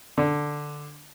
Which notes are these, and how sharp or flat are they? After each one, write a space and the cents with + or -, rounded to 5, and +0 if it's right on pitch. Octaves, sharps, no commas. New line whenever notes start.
D3 +5